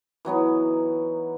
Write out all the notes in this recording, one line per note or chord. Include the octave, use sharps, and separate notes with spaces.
E3 F#3 B3 D#4